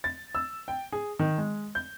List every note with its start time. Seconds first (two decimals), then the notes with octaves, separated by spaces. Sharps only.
0.04 A6
0.35 E6
0.68 G5
0.92 G#4
1.19 D#3
1.38 G#3
1.75 G6